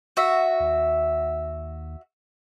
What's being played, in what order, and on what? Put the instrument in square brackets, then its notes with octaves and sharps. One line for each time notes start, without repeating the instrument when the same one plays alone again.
[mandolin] F#4 E5
[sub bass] D#2